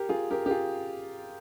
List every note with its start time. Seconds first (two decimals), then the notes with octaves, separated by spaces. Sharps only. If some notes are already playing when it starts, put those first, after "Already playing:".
Already playing: G4 A#4
0.09 F4 G#4
0.31 G4 A#4
0.46 G4
0.51 F4 G#4